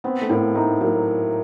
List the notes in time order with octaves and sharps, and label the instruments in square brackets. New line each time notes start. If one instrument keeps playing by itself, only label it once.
[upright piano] B3 [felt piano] C4
[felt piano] A3
[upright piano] A2 [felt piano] A#3
[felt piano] A3 [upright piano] D#4
[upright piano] F#3 [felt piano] A#3